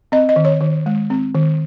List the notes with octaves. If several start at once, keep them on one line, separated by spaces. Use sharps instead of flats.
C4 D#5
D#5
D#3
C#5
D#3
G#3
C4
D#3